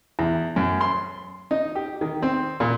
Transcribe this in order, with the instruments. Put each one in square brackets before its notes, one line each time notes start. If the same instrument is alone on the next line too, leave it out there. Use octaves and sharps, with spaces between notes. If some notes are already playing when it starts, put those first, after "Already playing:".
[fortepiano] E2
F#2
C6
D#4
G4
D#3
C4
A#2